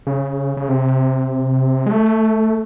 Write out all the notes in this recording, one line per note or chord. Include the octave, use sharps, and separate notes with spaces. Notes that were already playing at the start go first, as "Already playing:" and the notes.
C#3
C#3
C3
G#3
A3